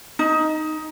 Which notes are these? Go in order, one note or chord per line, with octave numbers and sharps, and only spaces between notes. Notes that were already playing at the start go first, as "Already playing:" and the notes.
D#4